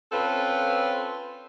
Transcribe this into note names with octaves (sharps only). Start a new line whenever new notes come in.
C4 C#4 F4 A4 B4